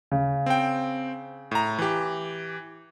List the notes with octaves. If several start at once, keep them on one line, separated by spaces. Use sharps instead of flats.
C#3
C4 G5
A2 A#5
E3 G4